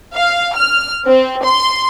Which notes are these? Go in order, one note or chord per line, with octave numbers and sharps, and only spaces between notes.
F5
F6
C4
C6